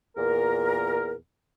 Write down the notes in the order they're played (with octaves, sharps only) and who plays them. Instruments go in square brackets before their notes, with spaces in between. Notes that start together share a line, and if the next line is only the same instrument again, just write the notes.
[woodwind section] E2 A#2 A#4